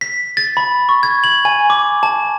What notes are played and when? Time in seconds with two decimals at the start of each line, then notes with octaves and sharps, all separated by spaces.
0.01 B6
0.37 A6
0.57 B5
0.89 C#6
1.03 G#6
1.24 F#7
1.45 G#5
1.70 D6
2.03 A5